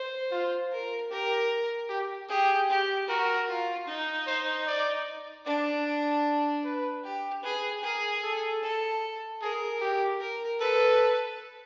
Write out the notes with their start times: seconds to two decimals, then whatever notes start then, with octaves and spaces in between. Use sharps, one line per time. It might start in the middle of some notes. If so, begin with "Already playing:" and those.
Already playing: C5
0.32 F4
0.71 A#4
1.10 G4 A#4
1.89 G4
2.29 G4 G#4
2.69 G4
3.08 F#4 A#4
3.48 F4
3.87 D#4
4.27 C5
4.67 D5
5.46 D4 D5
6.64 B4
7.04 G4
7.43 G#4 B4
7.83 G#4 A#4
8.23 A4
8.62 A4
9.42 G#4 A#4
9.81 G4
10.20 A#4
10.60 A4 B4